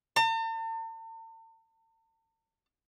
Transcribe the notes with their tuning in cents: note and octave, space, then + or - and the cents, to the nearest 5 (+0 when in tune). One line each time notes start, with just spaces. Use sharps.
A5 +45